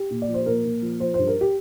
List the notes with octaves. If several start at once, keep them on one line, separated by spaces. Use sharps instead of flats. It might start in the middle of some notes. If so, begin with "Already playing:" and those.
Already playing: G4
A#2
D5
F3
C5
A#2 A#4
A#2
F3
F3 C5
G2 C5
A#4
G4